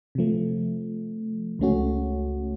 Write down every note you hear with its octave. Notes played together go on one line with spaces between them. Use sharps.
C3 F3 A3
C#2 C#3 A3 C#4 F#4